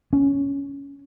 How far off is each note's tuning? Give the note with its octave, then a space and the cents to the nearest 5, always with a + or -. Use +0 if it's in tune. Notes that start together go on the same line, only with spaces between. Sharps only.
C#4 +10